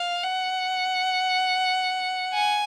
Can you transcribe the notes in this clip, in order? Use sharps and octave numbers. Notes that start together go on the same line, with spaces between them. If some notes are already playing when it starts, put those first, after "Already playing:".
Already playing: F5
F#5
G#5